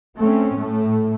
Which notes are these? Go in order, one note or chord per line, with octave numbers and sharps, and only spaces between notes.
A3 C4 C#4
A2 A3